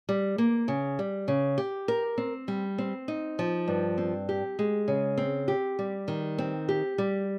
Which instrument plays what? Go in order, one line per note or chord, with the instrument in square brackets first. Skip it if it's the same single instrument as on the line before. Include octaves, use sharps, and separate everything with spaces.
[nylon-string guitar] G3
A#3
C#3
G3
C#3
G4
A#4
C4
G3
C4
D#4
F3
G2
C4
G4
G#3
C#3
C4
G4
G3
D#3
C4
G4
G3